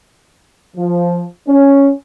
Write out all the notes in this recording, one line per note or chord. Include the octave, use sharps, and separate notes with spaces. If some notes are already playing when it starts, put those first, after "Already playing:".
F3
C#4